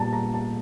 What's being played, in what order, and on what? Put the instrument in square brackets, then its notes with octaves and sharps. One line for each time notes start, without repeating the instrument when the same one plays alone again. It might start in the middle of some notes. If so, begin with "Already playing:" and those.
Already playing: [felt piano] A#2 G3 B3 A5 A#5
A#5
A5